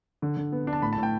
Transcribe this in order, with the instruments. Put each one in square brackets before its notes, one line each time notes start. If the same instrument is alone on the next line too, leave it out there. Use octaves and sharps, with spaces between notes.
[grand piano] D3
D3
B3
D4
A5
A2 B5
A2 A5
G5